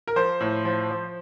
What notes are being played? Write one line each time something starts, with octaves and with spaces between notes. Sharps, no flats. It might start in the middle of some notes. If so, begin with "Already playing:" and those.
A#4
F3 C5
A2
F3
F3